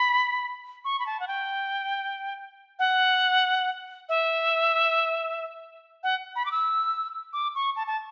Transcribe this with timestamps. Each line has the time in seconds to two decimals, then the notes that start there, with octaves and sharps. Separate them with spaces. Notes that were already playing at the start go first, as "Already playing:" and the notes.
Already playing: B5
0.85 C#6
0.99 B5
1.06 A5
1.20 F#5
1.28 G5
2.79 F#5
4.09 E5
6.03 F#5
6.36 B5
6.46 D6
6.51 E6
7.33 D6
7.55 C#6
7.76 A5
7.87 A5